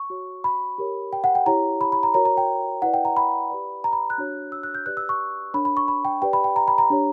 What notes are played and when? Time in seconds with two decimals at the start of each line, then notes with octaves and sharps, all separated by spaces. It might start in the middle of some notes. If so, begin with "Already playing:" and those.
Already playing: C#6
0.10 F#4 C#5
0.44 B5
0.78 G4 A#4 C#5
1.13 G5
1.24 F#5
1.35 G5
1.46 E4 G4 C#5 A#5
1.81 B5
1.92 B5
2.03 A#5
2.14 F#4 A#4 C#5 A#5
2.25 A#5
2.37 G5
2.82 E4 B4 D5 F#5
2.94 G5
3.05 A#5
3.17 B5
3.50 G4 B4 D5
3.84 A#5
3.93 B5
4.10 F#6
4.18 D4 F#4 C#5
4.52 E6
4.63 F#6
4.75 G6
4.86 G4 B4 D5 F#6
4.97 E6
5.09 C#6
5.54 D4 A#4 C#5 B5
5.65 B5
5.77 C#6
5.88 B5
6.05 G5
6.22 G4 B4 D5 G5
6.33 B5
6.44 G5
6.56 A#5
6.68 B5
6.78 A#5
6.90 D4 G4 C#5